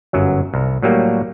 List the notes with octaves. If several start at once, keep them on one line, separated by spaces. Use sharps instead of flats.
G1 F#2 F#3
C2
A2 F#3 G3 A#3